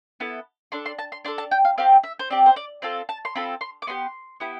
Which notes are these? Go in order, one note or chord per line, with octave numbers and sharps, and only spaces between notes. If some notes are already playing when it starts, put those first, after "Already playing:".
B3 E4 A4
D4 A4 C6
C6
A5
C6
D4 A4 C6
A5
G5
F5
C4 G4 F5
E5
C5
C4 G4 D5
C5
D5
C4 F4 A4 F5
A5
C6
C4 F4 A4 B5
C6
D6
B3 E4 G4 C6
B3 E4 G4